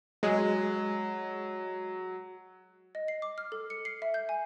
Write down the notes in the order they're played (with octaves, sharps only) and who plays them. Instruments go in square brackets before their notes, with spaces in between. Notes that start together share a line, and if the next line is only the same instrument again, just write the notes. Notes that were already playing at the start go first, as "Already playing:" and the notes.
[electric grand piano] F#3 [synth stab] G#3
[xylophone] D#5
C7
D6
F6
A4
C#7
C7
E5
G6
G#5